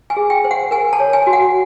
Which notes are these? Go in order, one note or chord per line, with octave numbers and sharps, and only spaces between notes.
G#5
G#4
G5
C5
F#5
A#4 G#5
A5
C#5
G#5
F#4
F#5